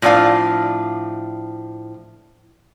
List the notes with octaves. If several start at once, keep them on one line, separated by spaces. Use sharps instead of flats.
A2 F3 C#4 D4 F5 G#5